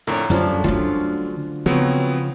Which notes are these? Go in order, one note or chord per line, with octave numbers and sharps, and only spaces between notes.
F2 A2 D3 A#4 C#5
F#2 D3 F3 G3 C#4 D4
D3 F#3 A3 D4 F4
C#3 F3 F#3 B3 C4 C#5